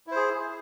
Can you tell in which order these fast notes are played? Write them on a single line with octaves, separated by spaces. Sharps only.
E4 C5 G#4